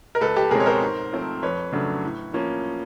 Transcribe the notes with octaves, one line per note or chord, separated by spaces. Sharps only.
A#4
C#2 A4 B4
G4 A4
B2 G#3 C4 G#4 A#4
C#5
A#4 C5
G#2
F3 A3 C4
F2 B4 C#5
C#3 F#3 A3 D4
A2
F3 A#3 C#4